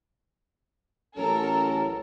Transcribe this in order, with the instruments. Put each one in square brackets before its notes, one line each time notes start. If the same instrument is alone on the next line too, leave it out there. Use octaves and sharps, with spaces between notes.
[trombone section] A1 F#3 C#4 [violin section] A4 A#4